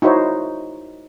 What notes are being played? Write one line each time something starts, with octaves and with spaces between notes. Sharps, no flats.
D#4 E4 F#4 C5 C#5